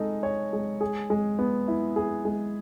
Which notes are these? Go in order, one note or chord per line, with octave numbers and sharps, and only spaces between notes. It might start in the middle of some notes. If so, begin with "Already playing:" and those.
Already playing: G#3 D#4 A4
C#5
G#3
G#4
G#3
B3
E4
G#4
G#3